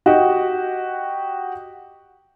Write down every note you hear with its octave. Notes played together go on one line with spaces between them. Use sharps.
F#4 G4 D#5